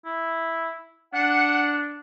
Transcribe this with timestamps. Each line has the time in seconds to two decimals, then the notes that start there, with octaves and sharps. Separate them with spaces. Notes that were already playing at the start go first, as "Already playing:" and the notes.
0.05 E4
1.14 D4 F#5